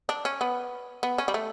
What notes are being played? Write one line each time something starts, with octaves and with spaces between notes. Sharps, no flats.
D4
C#4
B3
B3
C#4
G3
A3